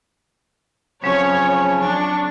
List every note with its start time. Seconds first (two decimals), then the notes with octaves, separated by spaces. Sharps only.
1.04 C#3 F3 F#3 C4 C#4 C#5
1.81 D4 C#6